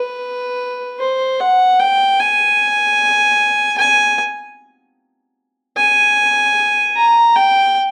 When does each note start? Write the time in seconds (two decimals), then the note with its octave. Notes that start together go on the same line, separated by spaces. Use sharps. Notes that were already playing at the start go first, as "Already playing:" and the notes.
Already playing: B4
1.00 C5
1.40 F#5
1.80 G5
2.20 G#5
3.78 G#5
5.77 G#5
6.96 A#5
7.36 G5